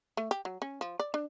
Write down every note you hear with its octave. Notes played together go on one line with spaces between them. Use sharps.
A3
G4
F#3
C#4
F3
D5
D4